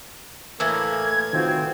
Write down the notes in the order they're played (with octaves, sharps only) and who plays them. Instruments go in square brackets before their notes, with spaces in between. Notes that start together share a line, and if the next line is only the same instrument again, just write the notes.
[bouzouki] A2 E3 [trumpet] A#3 [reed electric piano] E6 [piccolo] G#6
[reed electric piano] D#3 F4 F#4 [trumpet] C4